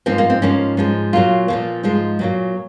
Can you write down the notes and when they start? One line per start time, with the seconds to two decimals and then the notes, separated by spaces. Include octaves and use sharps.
0.06 G#2 F3 A#3 C4
0.18 A#3
0.30 C4
0.42 G#2 F3 A#3 C#4
0.77 G#2 F3 G#3
1.13 A#2 F#3 A#3 F4
1.48 A#2 F3 A#3
1.83 G#2 F3 G#3
2.19 A#2 F#3 A#3